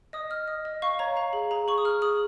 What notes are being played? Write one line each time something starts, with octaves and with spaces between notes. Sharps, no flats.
D#5 D#6
D#5 F6
D#5 D#6
D#5
F5 C#6
C#5 A#5
F5 A#5
G#4
G#4 A#5
G#4 C#6
D#6
G#4 F6
G#4 D#6